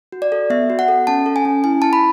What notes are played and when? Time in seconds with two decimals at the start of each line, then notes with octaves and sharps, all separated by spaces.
0.12 F#4
0.22 D5
0.32 A4
0.50 B3 E5
0.70 F#4
0.79 F#5
0.88 A4
1.07 C#4 A5
1.26 A4
1.36 G#5
1.45 C#4
1.64 E4 G#5
1.82 E4 A5
1.93 B5